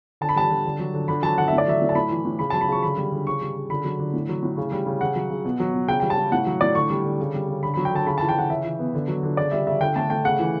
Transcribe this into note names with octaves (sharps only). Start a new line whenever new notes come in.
D3 A5
B5
G3 A5
D3
D3
F#3
D3
D3 B5
F#3 A5
D3 F#5
A2 E5
D5
F#3 E5
A2
A5
A2 B5
E3
A2
C#3 B5
F#3 A5
B5
C#3 C#6
D3 B5
G3
D3
C#3 C#6
G3
C#3
D3 B5
F#3
D3
A2
F#3
A2
C#3
G3
C#3
C#3 F#5
F#3
C#3
B2
F#3
B2
C#3 G5
G3 G5
A5
C#3
A2 F#5
F#3
A2 D5
D3 C#6
G3
D3
C#3
G3
C#3
D3 B5
F#3 B5
G5
D3 A5
C#3 B5
E3 A5
G5
C#3 F#5
C#3 E5
E3
B3
D3
F#3
D3
C#3 D5
G3 E5
C#3 E5
D3 G5
A3 A5
A3 G5
C#3 F#5
E3